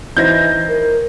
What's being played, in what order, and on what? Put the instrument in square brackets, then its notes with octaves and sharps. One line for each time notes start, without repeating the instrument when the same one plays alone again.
[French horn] E3 [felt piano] D#4 E4 C5 [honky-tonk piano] G6 G#6 A#6
[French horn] A#4